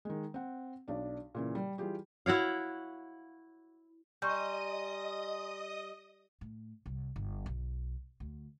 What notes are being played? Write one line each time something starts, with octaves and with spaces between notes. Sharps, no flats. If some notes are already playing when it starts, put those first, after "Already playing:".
D#3 G#3
C4 F#5
B1 D4 D5
A#2 C#3 E3
G3
E3 G3 F4 G4 G#4
E4 F#4 C#5 F5
G3 D#5 G#5 A#5 C6 C#6 D#6 G6
A2
C2
G1
B1
D2